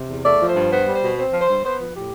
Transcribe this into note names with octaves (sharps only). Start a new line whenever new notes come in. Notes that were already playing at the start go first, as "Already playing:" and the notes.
Already playing: C3
E2
A3 D5
F3
C5
G2
B3 C5
G3
C5
B2
C4 C5
F3
C5
G2
B3 C5
F3 B4
A2 G4